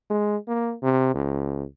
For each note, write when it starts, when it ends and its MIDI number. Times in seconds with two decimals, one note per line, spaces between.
0.10 0.36 56
0.48 0.74 58
0.83 1.11 48
1.14 1.64 37